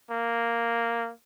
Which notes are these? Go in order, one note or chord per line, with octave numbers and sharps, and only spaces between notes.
A#3